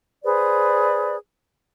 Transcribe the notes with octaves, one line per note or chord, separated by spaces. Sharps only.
G#4 B4 C5 D5